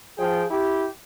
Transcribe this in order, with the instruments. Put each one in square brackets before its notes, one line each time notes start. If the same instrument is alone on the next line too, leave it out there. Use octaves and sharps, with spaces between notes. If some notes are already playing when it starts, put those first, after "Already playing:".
[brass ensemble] F3 G5 [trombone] G#4
[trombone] E4 [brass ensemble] G4